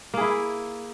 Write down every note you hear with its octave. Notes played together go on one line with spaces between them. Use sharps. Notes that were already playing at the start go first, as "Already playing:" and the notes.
A#3 E4 G#4